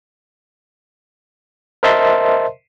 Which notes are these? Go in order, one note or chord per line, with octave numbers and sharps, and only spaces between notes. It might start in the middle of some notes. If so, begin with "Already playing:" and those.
A#4 C5 D#5 E5 A5 C6